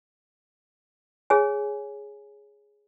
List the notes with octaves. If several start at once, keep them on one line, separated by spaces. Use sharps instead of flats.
G#4 C#5 G#5